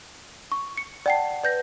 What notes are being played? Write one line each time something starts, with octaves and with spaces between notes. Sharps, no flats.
C#6
C#7
D5 F#5 G5 A5 C7
B4 D5 G6 A#6